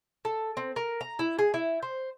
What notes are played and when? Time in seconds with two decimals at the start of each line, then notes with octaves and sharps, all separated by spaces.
0.25 A4
0.57 C4
0.76 A#4
1.01 A#5
1.19 E4
1.39 G#4
1.54 E4
1.82 C5